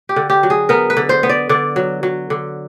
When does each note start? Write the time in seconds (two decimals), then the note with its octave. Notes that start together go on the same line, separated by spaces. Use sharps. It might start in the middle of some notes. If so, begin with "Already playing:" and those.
0.09 G4
0.16 D3
0.30 G4
0.43 F#3
0.50 G#4
0.69 B3 A#4
0.90 B4
0.97 D3
1.09 C5
1.23 B3
1.29 D5
1.49 D3 D5
1.76 F#3
2.03 F#3
2.30 D3